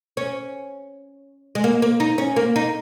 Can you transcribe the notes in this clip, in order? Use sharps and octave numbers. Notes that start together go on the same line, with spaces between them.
C#4
G#3
A#3
A#3
D#4
C#4
A#3
D#4